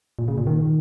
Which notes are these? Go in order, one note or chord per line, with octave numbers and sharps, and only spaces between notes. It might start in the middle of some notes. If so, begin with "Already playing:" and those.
A#2
C#3
A#2
D#3